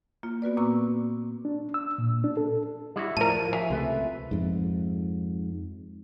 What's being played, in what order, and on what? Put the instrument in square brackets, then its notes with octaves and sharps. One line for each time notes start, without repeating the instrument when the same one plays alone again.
[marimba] A#3 F4
B3 F#4 B4 D5
A#2 A#3 C4 A#5 C#6 E6
[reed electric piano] D4
E6
A#2
D4
A4
[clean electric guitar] G3 E4 F#4
[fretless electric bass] A2 F3 [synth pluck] A#4 D#7 [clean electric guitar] D5 A5
[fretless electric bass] F3
[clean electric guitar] C#5 E5 G#5
[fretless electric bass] C#2 C3 A3 [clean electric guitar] F4 B4 E5
[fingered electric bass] F2 G#2